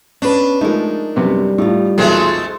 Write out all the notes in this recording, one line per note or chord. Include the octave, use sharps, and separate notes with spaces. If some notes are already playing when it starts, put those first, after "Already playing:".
C#4 D4 B4
F3 G#3 A3 D#4 A#4
F#2 C3 G3 B3
A2 D#4 F4
B1 E2 A#2 G#3 A3 C4